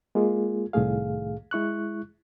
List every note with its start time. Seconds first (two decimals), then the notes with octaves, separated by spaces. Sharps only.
0.15 G#3 A#3 F4 G#4
0.73 C2 A2 D#3 A3 G#4 F5
1.51 G#3 E4 C#6 F#6